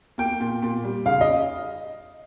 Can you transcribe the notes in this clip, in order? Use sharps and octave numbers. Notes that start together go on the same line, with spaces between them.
A#3 G5
A#2
A#2
G3
C#3 F5
D#5